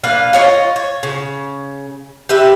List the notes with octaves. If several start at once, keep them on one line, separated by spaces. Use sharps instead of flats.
A#3 D4 B4 F5
F4 C#5 D#5
C#5
C#3
G4 B4 E5